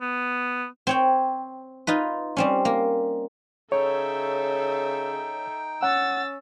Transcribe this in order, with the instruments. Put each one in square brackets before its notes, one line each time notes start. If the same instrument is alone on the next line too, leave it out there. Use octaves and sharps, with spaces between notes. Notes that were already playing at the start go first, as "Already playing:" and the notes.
[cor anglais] B3
[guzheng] C4 C#5 G5
D#4 F4 B4
G3 C4 C#4
A#3
[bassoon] C#3 [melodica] D#4 G5 [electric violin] A4 E5 [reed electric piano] C#5
[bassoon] C#4 [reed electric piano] F#5 [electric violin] E6 A6